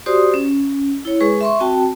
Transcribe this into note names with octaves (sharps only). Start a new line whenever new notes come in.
F#4 G4 C5 D5 C6 D#6
C#4
E4 C#5
G#3 G#4 B4 C#6
E5 C6 C#6
C4 F#4 G5 A5